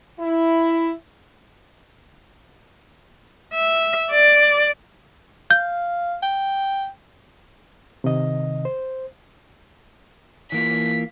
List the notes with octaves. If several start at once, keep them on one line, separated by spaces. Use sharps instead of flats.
E4
E5
D5
F5 G6
G5
C3 D#3 D#5
C5
E3 A#3 F4 B6